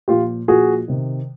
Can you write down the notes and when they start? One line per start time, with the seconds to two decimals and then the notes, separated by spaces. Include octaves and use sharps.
0.08 A#2 F3 F4 G4
0.48 A#2 F3 F#4 G#4
0.88 C3 D#3